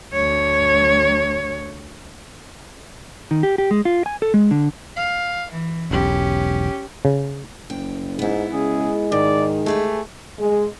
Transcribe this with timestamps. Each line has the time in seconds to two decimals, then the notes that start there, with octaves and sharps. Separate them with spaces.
0.13 D2 C#5
3.31 D#3
3.43 G4
3.58 G4
3.71 G#3
3.85 F4
4.06 G#5
4.22 A4
4.34 G#3
4.51 D3
4.96 F5
5.51 E3
5.91 E1 B1 C#4 G4
7.05 C#3
7.70 F#1 G5
8.19 G#2 B3 E4
8.53 C#3 G#3 G#4
9.12 G#2 D#3 D5
9.66 A3 G4 G#4 B4
10.39 G#3